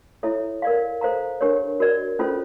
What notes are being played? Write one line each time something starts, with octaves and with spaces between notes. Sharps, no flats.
E4 A4 C#5 E5
A#4 D5 F5
A4 C5 F5 A#5
D4 G4 A#4 C#5
F#4 A#4 D5
C#4 F4 A4 C5